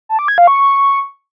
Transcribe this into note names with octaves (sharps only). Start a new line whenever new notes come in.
A5
D6
G#6
F5
C#6